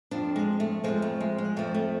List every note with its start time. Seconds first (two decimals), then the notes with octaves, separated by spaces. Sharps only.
0.11 F2 F3 D4
0.36 G#3
0.60 A3
0.84 F2 F3 G#3
1.02 A3
1.21 G#3
1.38 G#3
1.57 F2 F3 A3
1.74 A3